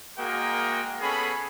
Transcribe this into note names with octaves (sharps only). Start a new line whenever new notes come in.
G#3 A#3 F#4 G#4 A#4 G5
B3 C#4 G#4 A4 B5